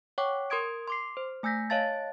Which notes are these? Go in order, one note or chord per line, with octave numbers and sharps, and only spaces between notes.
C#5 F#5 G5 C#6 D6
A#4 C6 D#6 G#6 D7
C6 D6 C7
C5
A3 G#5 E6 G6 A#6 B6
C#5 D#5 F5 A5 A6